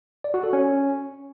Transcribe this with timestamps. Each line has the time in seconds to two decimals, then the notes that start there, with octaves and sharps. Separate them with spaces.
0.24 D5
0.34 F#4
0.43 A4
0.53 C#4